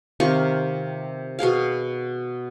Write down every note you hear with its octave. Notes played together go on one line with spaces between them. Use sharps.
C3 D#3 F4 C#6
B2 B3 G#4 F5